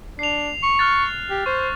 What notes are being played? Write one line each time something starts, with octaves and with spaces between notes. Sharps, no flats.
D4 C7 F7
C#6
F6 F#6 A6
G4
C5 C#6